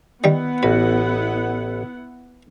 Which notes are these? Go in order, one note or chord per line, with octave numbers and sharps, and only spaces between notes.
D#3 G3 B3 E4 F#5 G5
A1 F#4 B4